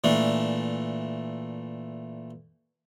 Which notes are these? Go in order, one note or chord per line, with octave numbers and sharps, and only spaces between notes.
A#2 E3 A3 D4